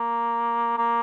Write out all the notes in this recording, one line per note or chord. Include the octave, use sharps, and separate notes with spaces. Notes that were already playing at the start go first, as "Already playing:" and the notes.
Already playing: A#3
A#3